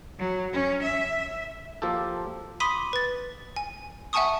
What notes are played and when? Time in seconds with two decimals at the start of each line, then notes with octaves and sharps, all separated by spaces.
0.19 F#3
0.53 C#4
0.83 E5
1.82 F3 A#3 F4 G4 A4
2.60 B5 C6 D6 D#6 B6 D#7
2.93 B4 A6
3.56 G#5
4.13 E5 F#5 G#5 A5 C#6 D#6